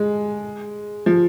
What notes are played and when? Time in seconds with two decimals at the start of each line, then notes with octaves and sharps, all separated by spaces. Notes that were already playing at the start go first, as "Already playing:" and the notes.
Already playing: G#3
1.06 F3